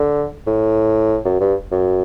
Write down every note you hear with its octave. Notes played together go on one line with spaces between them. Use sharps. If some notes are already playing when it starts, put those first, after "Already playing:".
Already playing: D3
A2
F#2
G2
F#2